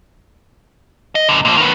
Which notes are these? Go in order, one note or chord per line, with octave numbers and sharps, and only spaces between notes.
D#5
F#2 D3
A#2 F3
D#3 B3